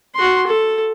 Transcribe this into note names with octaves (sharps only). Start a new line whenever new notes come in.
F#4 C6
A4